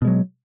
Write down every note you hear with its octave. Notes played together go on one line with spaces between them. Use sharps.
B2 F#3 G#3